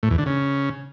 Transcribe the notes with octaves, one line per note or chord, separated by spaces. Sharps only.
A2
E2
D3
C#3